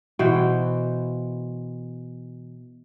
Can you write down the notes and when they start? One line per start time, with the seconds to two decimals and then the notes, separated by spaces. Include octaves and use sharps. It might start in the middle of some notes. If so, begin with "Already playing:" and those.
0.19 B2 E3 C5 G5